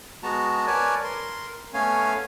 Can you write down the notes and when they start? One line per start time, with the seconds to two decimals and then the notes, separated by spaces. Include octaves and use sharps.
0.23 G#3 B3 F#4 A5 A#5
0.67 A#4 B4 C#5 D5 G#5 A5
1.04 A#4 C6
1.74 A3 B3 C#4 C#5 F5 G#5